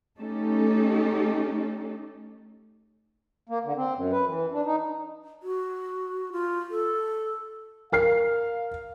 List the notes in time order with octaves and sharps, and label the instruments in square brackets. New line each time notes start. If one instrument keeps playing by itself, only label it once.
[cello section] A3 C#4 D#4 G4 A4
[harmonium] A#3
D3
C4
F#2
B4
E3
D4
D#4
[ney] F#4
F4
A4
[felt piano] A#4 F6 C7 [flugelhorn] F5